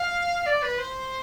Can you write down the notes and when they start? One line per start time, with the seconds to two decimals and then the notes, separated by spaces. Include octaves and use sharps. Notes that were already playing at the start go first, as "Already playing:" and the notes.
Already playing: F5
0.46 D5
0.62 B4
0.78 C5